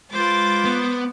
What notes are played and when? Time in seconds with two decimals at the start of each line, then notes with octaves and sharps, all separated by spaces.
0.13 G#3 F4 B4 C5 D6 A6
0.65 B3